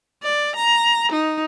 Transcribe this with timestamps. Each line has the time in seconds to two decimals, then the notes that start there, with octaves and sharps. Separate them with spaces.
0.23 D5
0.56 A#5
1.12 D#4